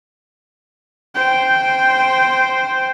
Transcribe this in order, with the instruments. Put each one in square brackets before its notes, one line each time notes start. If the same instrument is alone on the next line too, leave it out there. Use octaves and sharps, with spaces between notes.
[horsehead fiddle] C5 G5